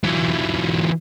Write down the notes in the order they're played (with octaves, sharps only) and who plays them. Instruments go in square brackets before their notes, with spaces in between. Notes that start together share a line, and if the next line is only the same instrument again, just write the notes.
[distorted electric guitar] E3 F#3